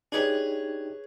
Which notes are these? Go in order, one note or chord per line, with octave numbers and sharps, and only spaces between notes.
D4 D#4 G4 G#4 B4 C#5